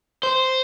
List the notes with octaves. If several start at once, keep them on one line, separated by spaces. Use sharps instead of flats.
C5